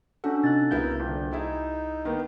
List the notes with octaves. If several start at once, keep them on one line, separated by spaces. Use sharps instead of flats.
C#4 D4 F#4 A4
C3 D#4 F#6 A6
C2 C#3 B3 E4 F#4 A#4 G6
D#1 D3
D#4 E4 G#4 E5
D#3 A#3 B3